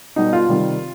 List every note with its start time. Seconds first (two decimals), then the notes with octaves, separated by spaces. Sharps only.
0.16 B2 G3 D#4
0.33 F4
0.48 C3 D#3 G3